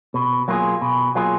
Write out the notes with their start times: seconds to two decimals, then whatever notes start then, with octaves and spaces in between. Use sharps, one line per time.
0.14 B2
0.48 F#3 A#3 F4 G#4
0.81 B2
1.15 F#3 A#3 F4 G#4